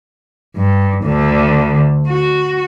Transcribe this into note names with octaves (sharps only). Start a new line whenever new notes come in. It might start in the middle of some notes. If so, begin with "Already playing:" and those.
G2
D2 D3
F#4